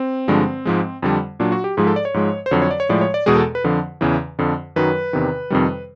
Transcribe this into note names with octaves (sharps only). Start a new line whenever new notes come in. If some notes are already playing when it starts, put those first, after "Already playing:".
Already playing: C4
G2 D3 F3 G#3
G#2 F3 G#3
F2 D3 G3
A#2 F#3 D4
F#4
G4
G#2 F3 G#3 G#4
A4
D5
C#5
G#2 F3 G#3
C5
F2 D3 F#3 C#5
C#5
D5
C#5
A2 F3 G#3 D5
C#5
D5
E2 B2 G#3 G#4
A4
B4
F2 D3 F3
E2 C#3 E3
F2 D3 F3
F#2 D#3 F#3 B4
E2 C3 D#3
F2 C3 D#3 G3